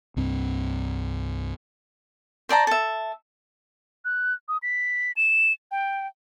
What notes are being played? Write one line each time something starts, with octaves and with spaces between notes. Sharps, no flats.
C2 G2 C4
C5 D5 A5 A#5
A4 E5
F#6
D#6
B6
E7
G5